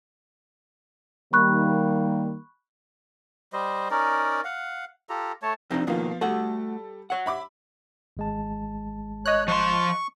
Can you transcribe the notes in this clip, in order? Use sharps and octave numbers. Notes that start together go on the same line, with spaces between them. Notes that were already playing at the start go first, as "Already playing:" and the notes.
D#3 G3 A#3 B5 C#6 F#6
G3 C5 D#5
C#4 D#4 A#4 D5
F5 F#5
F4 G4 A4 A#5
A3 C#5 A5
C3 F3 C4 D4 D#4
B2 D#3 F3 A#3 B3 F4
G3 A3 F#4 A4 F#5
C#5 F#5
E5 B5 D6
G#1 G#3 A5
C#5 D#5 F#6
F3 C6 C#6